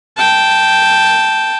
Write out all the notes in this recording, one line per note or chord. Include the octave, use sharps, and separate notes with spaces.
G5 A5